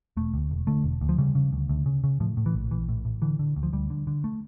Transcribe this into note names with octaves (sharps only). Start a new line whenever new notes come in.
E1 A3
D2
E1
D3 A3
E1
D2
F3
C#3 G3
C#3
D2
D2
C#3
C#3
A2 F3
A2
E3
A#1
A#1 E3
A2
A2
D3 E3
D3
D2
F3
D2 G3
D3
D3
A3